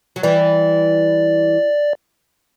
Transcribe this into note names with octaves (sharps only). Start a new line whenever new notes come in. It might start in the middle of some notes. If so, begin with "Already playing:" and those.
F#3
E3 G3 D5